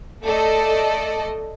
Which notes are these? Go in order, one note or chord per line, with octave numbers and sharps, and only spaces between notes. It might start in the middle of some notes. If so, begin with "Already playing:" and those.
A3 A4 D5 D#5